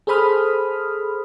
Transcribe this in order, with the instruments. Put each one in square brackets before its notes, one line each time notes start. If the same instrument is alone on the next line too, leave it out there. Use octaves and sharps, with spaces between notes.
[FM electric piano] G#4 A4 C5 B5 D#6 F6